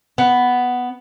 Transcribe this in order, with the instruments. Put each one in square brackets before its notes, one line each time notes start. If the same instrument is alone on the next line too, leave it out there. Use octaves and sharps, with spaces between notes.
[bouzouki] B3